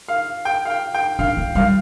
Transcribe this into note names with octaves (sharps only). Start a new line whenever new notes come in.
F5
G5
F5
G5
G5
D4 F5
A#3
G3 F5